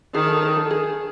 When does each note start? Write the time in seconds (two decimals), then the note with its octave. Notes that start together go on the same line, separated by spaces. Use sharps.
0.14 D#3 G#4
0.28 A4
0.43 A#4
0.57 A4
0.71 G#4